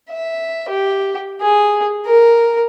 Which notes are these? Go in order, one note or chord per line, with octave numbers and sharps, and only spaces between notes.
E5
G4
G#4
A#4